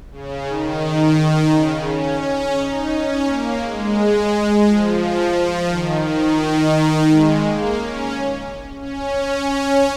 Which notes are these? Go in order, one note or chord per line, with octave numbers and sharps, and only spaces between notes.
C#3
D#3
C#3
C#4
C#4
D#4
C#4
A#3
G#3
F3
D#3
D#3
G#3
A#3
C#4
C#4
C#4